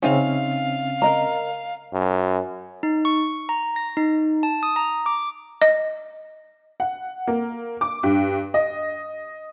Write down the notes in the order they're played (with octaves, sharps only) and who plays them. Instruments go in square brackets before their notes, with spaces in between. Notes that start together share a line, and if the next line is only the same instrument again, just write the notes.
[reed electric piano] C#3 C4 C#4 [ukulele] D#4 E5 [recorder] F5
[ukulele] A#4 D#5 A#5
[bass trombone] F#2
[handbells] D#4
C#6
A#5
A#6
D#4
A5
D#6
A#5
D6
[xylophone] D#5
[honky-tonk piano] F#5
A#3
D6
G2
D#5